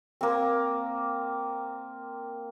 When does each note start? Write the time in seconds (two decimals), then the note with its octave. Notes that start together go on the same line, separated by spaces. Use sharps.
0.21 A#3 C4